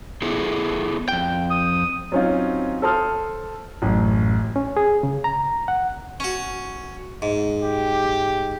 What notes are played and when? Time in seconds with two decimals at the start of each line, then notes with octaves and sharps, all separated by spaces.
0.22 B3 E4 G#4 A4
1.08 F2 G5
1.50 D#6
2.12 F#3 C4 C#4 D#4 F4
2.82 A4 C5 A5 C6 D#6 F6
3.82 A1 F#2
4.56 C#4
4.77 G#4
5.03 C#3
5.24 A#5
5.68 F#5
6.20 C#4 F#4
7.22 G#2
7.63 G4